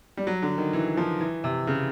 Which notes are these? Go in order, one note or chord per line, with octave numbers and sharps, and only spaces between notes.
G3
F#3
D3
D#3
E3
F3
E3
C3
C#3